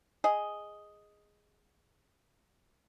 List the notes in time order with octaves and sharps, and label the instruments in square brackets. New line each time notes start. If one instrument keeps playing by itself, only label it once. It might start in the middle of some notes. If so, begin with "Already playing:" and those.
[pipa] G#4 D#5